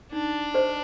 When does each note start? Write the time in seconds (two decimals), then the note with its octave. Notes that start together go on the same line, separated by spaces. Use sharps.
0.13 D4 D#4
0.54 G4 C5 D#5